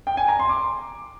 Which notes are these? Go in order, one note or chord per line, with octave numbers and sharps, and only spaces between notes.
G5
G#5
A#5
C6
D6